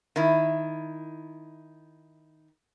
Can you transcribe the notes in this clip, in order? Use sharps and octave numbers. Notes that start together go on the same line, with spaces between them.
D#3 E4